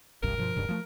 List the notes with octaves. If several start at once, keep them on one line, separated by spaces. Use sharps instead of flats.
F#1 C2 G2 A#4
G2 B2 F3
D#1 G2 C#3
F3 A3